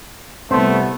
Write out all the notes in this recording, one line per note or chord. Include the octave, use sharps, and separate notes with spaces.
C2 A3 B3 C4 C5